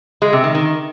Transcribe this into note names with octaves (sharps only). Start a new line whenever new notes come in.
G#3
C3
D#3
D#3